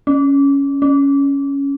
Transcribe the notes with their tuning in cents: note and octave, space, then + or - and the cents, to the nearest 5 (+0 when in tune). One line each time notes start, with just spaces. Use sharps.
C#4 +5
C#4 +5